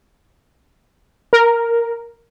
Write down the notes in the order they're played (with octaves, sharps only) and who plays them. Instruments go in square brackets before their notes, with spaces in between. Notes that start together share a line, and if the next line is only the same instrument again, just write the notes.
[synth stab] A#4